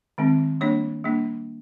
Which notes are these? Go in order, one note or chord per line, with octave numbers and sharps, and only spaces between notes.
D#3 G#3 C4
G3 A#3 D4 C#5
G3 A#3 D4